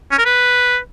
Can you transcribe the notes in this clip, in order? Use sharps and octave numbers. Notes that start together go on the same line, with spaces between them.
C#4
A#4
B4